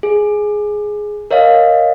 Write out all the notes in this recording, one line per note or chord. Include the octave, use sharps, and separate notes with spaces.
G#4
A#4 C#5 D#5 F5